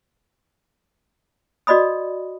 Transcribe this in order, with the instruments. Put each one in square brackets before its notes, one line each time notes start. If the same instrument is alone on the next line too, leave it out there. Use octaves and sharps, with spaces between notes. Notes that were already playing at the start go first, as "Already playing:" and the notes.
[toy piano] F#4 D5 D#5 B5 D#6